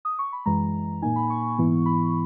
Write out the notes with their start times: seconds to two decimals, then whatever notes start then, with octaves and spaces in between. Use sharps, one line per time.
0.05 D#6
0.19 C#6
0.32 B5
0.46 F#2 E3 G#3 A#5
1.02 A#2 A#3 D#4 G#5
1.16 B5
1.30 C#6
1.58 G#2 E3 B3 E4
1.86 B5